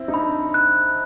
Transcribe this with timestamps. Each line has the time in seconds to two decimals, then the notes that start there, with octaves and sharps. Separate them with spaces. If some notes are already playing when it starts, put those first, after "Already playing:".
Already playing: C4 E4
0.08 D#4
0.14 D4 B5
0.54 F#6